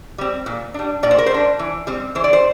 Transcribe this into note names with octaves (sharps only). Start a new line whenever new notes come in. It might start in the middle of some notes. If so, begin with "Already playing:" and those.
G3 C4
A#2
G3 D4
A#2 D5
C5
A#4
C5
G3 D4
E3
G3 C4
E3 C5
D5
C5